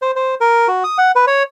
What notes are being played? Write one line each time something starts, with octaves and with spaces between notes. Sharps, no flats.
C5
C5
A#4
F#4
D#6
F#5
B4
C#5